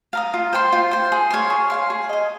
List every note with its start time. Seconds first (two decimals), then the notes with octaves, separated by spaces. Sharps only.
0.13 F5 A#5 D#6
0.34 F4
0.53 C5 G5 C6
0.72 F4
0.91 C5 G5 C6
1.12 G#4
1.30 C#5 F5 C6
1.50 G#4
1.70 C#5 F5 C6
1.90 G#4
2.09 D#5 G#5